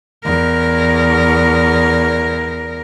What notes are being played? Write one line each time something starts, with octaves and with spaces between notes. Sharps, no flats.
E2 A#4